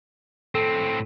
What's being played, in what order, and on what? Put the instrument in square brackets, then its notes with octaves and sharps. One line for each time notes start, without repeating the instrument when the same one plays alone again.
[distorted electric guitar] A2 C4 [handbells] A4